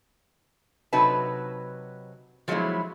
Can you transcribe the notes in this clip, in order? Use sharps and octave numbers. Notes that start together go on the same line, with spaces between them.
C3 F#3 D#4 F#4 B4 A5
F3 F#3 G#3 A3 B3 E4